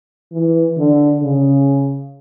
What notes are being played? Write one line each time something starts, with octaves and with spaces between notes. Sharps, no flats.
E3
D3
C#3